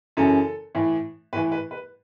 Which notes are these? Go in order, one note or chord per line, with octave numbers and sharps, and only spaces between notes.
F#2 C#3 E3 A4
A2 E3
A2 E3 B4
B4
B4